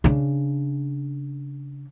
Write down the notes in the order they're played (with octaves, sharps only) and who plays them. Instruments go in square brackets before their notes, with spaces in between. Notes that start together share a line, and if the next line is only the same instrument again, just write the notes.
[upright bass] C#3 D4